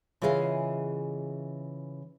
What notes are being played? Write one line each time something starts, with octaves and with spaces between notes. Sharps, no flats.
C#3 E3 F4 G#4 D#5 F5